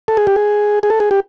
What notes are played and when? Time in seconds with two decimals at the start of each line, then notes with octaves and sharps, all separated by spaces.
0.08 A4
0.17 G#4
0.27 G4
0.36 G#4
0.83 G#4
0.90 A4
1.00 G#4
1.11 G4